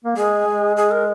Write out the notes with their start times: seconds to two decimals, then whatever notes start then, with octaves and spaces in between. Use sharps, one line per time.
0.04 A#3
0.16 G#3 G#4
0.47 G#3
0.77 G#4
0.91 A#4